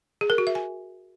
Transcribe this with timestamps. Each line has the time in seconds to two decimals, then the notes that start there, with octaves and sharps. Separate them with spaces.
0.21 G#4
0.30 A#4
0.38 F#4
0.47 E5
0.55 G#5